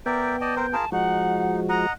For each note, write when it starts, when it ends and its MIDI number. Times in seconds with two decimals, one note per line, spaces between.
0.06 0.76 59
0.06 0.36 70
0.06 0.36 74
0.06 0.36 76
0.06 0.76 79
0.41 0.55 74
0.41 0.55 75
0.41 0.55 81
0.56 0.67 60
0.56 0.67 70
0.56 0.67 72
0.73 0.85 65
0.73 0.85 68
0.73 0.85 70
0.73 0.92 81
0.92 1.86 53
0.92 1.86 56
0.92 1.60 63
0.92 1.86 66
0.92 1.56 78
1.69 1.93 75
1.69 1.93 78
1.69 1.91 82